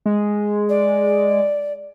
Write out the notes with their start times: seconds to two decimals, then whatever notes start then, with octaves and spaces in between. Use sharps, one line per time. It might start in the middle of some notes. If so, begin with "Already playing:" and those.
0.06 G#3
0.69 D5